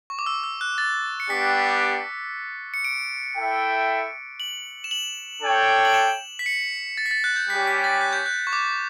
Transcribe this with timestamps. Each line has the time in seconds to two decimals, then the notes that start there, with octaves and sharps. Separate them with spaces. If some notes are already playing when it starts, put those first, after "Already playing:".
0.10 C#6
0.19 D6
0.26 E6
0.44 E6
0.61 F#6
0.78 A6
1.20 C#7
1.29 G3 B3 D4 G4 B6
2.74 C#7
2.85 D7
3.36 E4 A4 E5 G5
4.40 F#7
4.84 E7
4.91 F#7
5.42 D4 A4 C#5 G5
5.85 F#7
5.94 E7
6.39 B6
6.46 C#7
6.97 A6
7.06 B6
7.11 A6
7.24 F#6
7.36 G6
7.49 G3 C#4 G4 B6
7.67 B6
7.84 A6
8.01 F#6
8.13 G6
8.26 F#6
8.47 C#6
8.53 D6